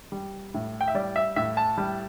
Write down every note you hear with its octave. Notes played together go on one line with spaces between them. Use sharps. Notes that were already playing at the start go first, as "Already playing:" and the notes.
G3
A2
G5
E5
G3 D5
E5
A2 E5
A5
G3